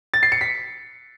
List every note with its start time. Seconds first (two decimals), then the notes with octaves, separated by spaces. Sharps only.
0.14 A6
0.23 C7
0.32 C#7
0.41 B6